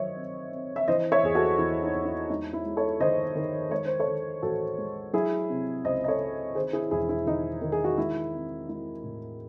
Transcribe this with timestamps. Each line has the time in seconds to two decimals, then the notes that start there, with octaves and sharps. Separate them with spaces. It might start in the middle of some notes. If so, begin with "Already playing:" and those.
Already playing: D#3 F#3 C5 C#5 D#5 E5
0.16 C4
0.52 C4
0.76 E5
0.88 E3 C5 D#5
1.12 C#5 E5
1.23 E2 G#4
1.35 F#4 A4
1.58 E2 E4
1.83 D#4
1.94 E2
2.05 E4
2.30 G#3 D#4
2.53 E4
2.65 G#3
2.77 A4 C#5
3.00 D#3 C5 D#5
3.35 D#3
3.71 G#3 C#5
3.86 C5
3.99 A4 C#5
4.07 D#3
4.42 A1 F#4 A4
4.78 G#3
5.13 F#3 E4 G#4
5.50 C3
5.84 C#2 C5 D#5
6.04 D#5
6.08 A4 C#5
6.20 C3
6.55 D#3 G#4 C5
6.73 E4 G#4
6.91 E1 E4 G#4
7.09 E4
7.26 D#3 D#4
7.61 D#3
7.72 G#4
7.84 F#4
7.98 G#3 E4
8.34 C4
8.69 G#3 E4
9.04 A2